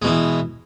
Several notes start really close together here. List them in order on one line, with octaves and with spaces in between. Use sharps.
G#3 B2 E3